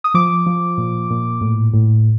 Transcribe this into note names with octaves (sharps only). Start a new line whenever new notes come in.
D#6
F3 D6
F3
A#2
A#2
A2
A2